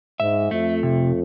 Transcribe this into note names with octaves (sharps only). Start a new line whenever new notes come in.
G#2 E5
F2 A3
C3